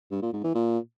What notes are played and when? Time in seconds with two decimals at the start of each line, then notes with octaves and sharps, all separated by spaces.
0.11 G2
0.22 A#2
0.33 G#2
0.44 E3
0.55 A#2